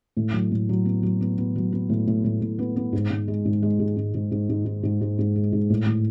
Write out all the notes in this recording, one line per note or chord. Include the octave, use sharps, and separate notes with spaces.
A2
F#3
A2
F#3
B3
F#3
B3
B3
F#3
B3
A2
A2
A2
A2
B3
B3
G#2
G#2
G#3
G#2
G#3
G#2
G#2
G#2
G#2
G#2
G#2
G#2
G#2
G#2
G#3
G#2
A2
A2